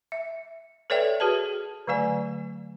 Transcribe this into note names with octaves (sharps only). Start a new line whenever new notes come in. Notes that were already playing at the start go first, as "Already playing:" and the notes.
E5
A4 B4 C#5 D5 E5 G5
F#4 G#4 B4 A5
D3 F#3 A3 D5 G#5